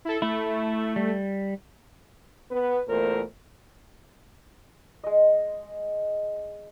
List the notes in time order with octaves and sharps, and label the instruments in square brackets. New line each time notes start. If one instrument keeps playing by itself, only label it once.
[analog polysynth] E4 A4
[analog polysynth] A3 [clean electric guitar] E4
[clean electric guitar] G3
[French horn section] B3 B4
E2 A#2 A3 A#4 C5
[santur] G#3 D#5